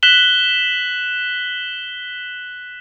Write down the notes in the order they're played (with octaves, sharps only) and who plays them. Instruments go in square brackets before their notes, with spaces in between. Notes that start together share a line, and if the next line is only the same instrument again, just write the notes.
[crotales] F#6 B6 E7 F#7 G7